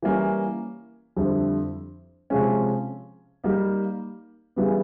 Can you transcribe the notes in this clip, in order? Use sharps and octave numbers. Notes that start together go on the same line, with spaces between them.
E3 G3 A#3 C#4
F2 D3 G3 C4 E4
C3 F3 G#3 C#4
G3 A#3 D#4
C#3 E3 G3 B3